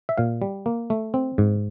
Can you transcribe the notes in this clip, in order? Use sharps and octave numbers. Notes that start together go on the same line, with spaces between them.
E5
A#2 F5
G3
A#3
A3
C4
G#2